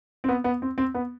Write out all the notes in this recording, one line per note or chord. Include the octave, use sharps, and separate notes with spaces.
C4
B3
B3
C4
C4
B3